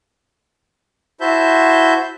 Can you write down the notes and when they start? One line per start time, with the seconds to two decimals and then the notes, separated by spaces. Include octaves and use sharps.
1.21 E4 F#4 C5 E5 A5 G6